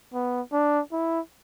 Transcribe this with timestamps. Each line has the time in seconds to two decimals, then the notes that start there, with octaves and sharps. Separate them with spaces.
0.14 B3
0.53 D4
0.92 E4